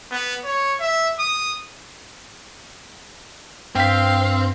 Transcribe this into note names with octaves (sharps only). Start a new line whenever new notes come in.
B3
C#5
E5
D#6
G2 C4 F5 G5 B6